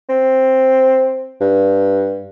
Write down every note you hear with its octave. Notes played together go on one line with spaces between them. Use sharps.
C4
G2